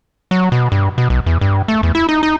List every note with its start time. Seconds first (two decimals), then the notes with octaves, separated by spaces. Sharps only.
0.31 F#3
0.52 B2
0.72 G2
0.98 B2
1.10 B1
1.26 E2
1.41 G2
1.68 A3
1.83 E2
1.95 E4
2.09 D#4
2.23 D#4